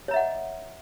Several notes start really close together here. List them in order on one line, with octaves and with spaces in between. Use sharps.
C#5 A#5 E5 F#5 D#5